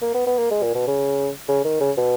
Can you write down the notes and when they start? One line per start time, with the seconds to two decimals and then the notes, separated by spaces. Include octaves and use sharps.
0.02 A#3
0.14 B3
0.27 B3
0.38 A#3
0.51 G#3
0.63 A#2
0.75 B2
0.87 C#3
1.48 C#3
1.65 D#3
1.80 C#3
1.97 B2